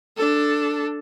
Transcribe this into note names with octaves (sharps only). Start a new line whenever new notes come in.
D4 A4